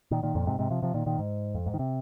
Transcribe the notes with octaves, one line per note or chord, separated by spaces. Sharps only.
A#2 D#3
A#2 D#3
F2 A#2
G#2 C3
G#2 C3
C3 F3
C3 F3
A#2 D#3
A#2 D#3
G#2
F2
G#2
D#3
C3